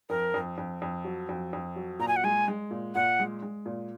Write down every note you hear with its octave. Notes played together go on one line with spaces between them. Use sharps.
F2 A#4
F2
F2
F2
F#3
F2
F2
F#3
A#2 A#5
G#5
F#5
G#3 G#5
G#3
A#2
A#2 F#5
G#3
G#3
A#2